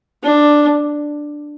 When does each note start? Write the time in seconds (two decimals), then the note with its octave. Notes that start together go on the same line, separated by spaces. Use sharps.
0.24 D4